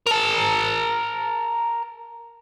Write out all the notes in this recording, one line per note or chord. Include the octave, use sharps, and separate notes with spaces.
A#4 A5